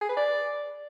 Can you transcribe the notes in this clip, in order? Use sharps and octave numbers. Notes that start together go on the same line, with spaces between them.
G#4
B4
D5